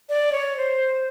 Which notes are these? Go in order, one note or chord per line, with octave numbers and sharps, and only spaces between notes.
D5
C#5
C5